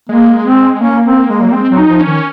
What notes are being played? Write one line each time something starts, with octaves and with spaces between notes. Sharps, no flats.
G#3 A#3
C4
A#3 C#4
C4
G#3
F#3
G#3 C4
F#3
D#4
F3
C#4
D#3